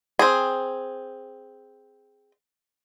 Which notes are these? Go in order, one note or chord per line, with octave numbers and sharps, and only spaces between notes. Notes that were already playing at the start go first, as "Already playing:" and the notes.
C4 G#4